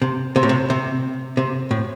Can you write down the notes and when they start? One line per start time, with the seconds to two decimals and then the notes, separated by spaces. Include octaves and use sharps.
0.02 C3
0.36 C3
0.43 A2
0.49 C3
0.70 C3
1.37 C3
1.71 A2